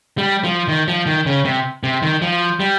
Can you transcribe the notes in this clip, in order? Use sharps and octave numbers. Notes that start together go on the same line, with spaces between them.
G3
F3
D#3
F3
D#3
C#3
C3
C3
D#3
F3
G3